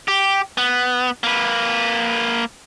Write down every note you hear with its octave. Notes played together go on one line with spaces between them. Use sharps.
G4
B3
A#3 B4